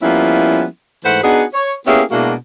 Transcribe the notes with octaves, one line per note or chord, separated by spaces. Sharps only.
F3 G3 A#3 B3 C#4 E4
G#2 E3 A3 B4 C5 F#5
B3 D4 D#4 F#4 G#4
C#5
A#3 B3 C#4 E4 G4 G#4
B2 G#3 A#3 D4 E4 F#4